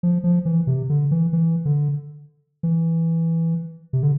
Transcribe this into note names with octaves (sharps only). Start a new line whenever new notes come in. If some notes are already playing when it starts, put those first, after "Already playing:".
F3
F3
E3
C3
D3
E3
E3
D3
E3
C3
D3